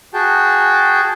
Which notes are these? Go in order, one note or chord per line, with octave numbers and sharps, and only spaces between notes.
F#4 G#4 G5 A5